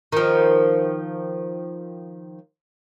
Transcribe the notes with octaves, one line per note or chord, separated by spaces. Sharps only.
D#3 F3